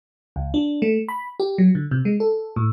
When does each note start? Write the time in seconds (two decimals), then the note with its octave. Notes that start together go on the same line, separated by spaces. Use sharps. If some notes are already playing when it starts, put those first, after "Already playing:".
0.36 C#2
0.54 D4
0.82 A3
1.09 B5
1.40 G4
1.58 F#3
1.75 D3
1.91 C3
2.05 G#3
2.20 A4
2.56 A2